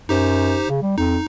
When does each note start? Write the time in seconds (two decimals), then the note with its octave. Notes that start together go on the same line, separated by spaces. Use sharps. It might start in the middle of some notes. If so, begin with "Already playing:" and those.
0.09 F#2 D#4 G4 C5
0.69 C#3
0.82 G3
0.98 F2 D#4